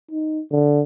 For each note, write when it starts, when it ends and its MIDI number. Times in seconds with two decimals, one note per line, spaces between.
0.11 0.41 63
0.52 0.82 50